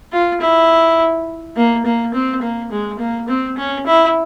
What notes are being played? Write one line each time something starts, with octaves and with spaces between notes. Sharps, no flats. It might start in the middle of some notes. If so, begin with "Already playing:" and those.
F4
E4
A#3
A#3
C4
A#3
G#3
A#3
C4
C#4
E4